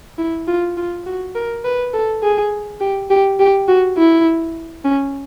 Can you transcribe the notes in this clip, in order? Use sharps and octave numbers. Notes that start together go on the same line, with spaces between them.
E4
F4
F4
F#4
A#4
B4
A4
G#4
G4
G4
G4
F#4
E4
C#4